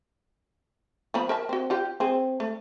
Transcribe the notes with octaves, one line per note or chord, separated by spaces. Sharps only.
F3 B3 B5
A#4 E5 A5
C4 F#4
F4 G4 G5
C4 G#4
A3